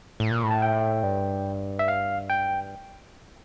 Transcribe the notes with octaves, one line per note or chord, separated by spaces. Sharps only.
A2
A#2
A2
A5
G5
G2
E5
F5
G5